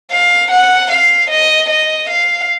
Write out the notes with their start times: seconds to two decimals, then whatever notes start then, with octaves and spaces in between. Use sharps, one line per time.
0.11 F5
0.51 F#5
0.91 F5
1.30 D#5
1.70 D#5
2.09 F5